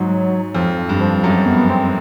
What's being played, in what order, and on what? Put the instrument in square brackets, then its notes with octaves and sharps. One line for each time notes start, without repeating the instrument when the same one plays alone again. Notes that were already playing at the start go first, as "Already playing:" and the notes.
Already playing: [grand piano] G#2 [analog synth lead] F#3
[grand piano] F2 [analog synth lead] F3
[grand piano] G2
[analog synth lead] F3
[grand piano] F#2 [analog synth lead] F#3
[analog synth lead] B3
C4